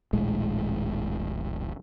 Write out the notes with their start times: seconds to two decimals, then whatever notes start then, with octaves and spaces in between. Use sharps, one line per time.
0.13 D#1 A#1 A2 G#3